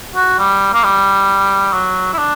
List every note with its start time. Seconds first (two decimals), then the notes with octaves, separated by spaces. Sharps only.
0.16 F#4
0.39 G3
0.74 A#3
0.84 G3
1.73 F#3
2.14 E4
2.18 D4